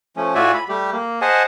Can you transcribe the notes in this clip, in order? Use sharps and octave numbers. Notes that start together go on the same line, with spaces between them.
F3 A3 C#4
A2 F4 F#4 D5 E5 G#5
B5
G3 A3 G4
A#3
G#4 C5 D#5 F#5 G#5 A5